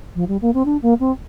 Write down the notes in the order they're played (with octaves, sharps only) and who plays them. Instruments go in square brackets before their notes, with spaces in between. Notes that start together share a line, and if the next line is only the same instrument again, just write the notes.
[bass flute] F3
G3
A#3
C4
D4
A#3
C4